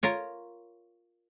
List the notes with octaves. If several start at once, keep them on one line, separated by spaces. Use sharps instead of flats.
F4 A#4 C#5